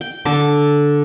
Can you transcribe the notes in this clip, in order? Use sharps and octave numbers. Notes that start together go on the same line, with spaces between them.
G5
D3 A4 D6